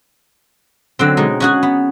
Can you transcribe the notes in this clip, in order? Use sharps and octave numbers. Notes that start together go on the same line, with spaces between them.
D3 F#3 C4
B2 G#3 D#4
C#4 F#4 G#4
B3